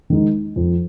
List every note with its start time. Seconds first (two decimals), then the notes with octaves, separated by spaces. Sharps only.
0.10 D#3 G#3 D#4
0.56 F2